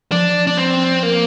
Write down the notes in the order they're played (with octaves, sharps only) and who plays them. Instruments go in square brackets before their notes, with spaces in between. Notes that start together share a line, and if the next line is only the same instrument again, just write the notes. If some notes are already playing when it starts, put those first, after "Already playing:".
[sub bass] F3 [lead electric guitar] D4
[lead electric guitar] D4
C4
A#3